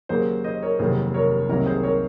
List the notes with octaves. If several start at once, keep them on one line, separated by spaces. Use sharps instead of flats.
D#2 C#3 F#3 A#3 G#4 C5
C5 D#5
A#4 C#5
F1 D#2 D#3 F#3 G#4 C5
A#4 C#5
C2 C3 D#3 F#3 A#3 A#4 C#5
G#4 C5
A#4 C#5